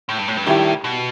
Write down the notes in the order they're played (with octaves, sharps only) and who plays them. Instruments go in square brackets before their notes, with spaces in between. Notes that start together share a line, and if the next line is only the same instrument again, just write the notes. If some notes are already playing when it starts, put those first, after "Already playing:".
[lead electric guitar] A2
G2
A2
G2
[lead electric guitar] A2 [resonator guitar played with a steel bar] D#3 G3 B3 E4 G4
[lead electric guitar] B2